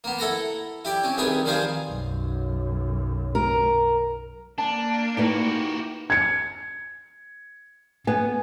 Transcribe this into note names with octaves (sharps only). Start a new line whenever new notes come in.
A#3 B3
E4 A4 F#5 A#5 B5
E4 G4 D5
C4 C#4
C2 C3 D#3 G#4 B4 E5
D#3 F3 G3 G#4 C5 F5
B1 F#2
A#4
A#3 D4 A5
D#4 E4 F#4 G4 B4 D5
G#6 C#7
B3 G#5